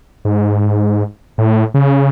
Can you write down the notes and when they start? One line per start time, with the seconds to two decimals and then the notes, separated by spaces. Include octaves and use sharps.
0.25 G#2
1.38 A2
1.74 C#3